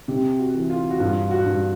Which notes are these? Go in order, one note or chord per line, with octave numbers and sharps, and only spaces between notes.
C3 G4
F#4
E3
F4
F#4
G2 F4
F#4
G2